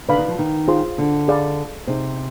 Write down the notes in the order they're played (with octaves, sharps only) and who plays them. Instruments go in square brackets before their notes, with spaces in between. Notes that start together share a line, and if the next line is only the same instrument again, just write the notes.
[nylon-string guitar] D3 [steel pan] B4 D5 F5 B5
[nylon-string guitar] D#3
F3
D#3
[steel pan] F4 G#4 C5 F5 C6
[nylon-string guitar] D3
[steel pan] G#4 D5 F5 G#5 B5
[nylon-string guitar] C3 [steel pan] D#4 G#4 C5